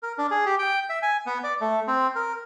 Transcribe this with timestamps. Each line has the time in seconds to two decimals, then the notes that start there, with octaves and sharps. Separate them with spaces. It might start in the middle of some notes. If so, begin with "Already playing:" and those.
0.03 A#4
0.18 D4
0.31 G#4
0.46 G4
0.59 G5
0.90 E5
1.03 G#5
1.26 B3
1.44 D5
1.61 A3
1.88 C4
2.15 A#4